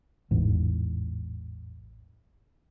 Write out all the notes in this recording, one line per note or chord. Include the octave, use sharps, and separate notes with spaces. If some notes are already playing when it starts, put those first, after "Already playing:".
A1 E2 G#2 E3